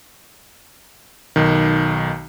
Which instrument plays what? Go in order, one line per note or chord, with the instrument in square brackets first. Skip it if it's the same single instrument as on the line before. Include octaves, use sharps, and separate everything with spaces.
[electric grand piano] B1 D#3